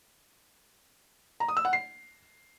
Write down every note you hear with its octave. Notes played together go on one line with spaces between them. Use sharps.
A#5
D#6
E6
F#5
C7